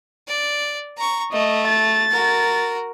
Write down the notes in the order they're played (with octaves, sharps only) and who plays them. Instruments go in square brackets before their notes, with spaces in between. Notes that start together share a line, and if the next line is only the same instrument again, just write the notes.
[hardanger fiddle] D5
A#5 C#6
[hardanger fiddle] A3 [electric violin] D#5
[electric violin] A6
[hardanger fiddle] F#4 A#4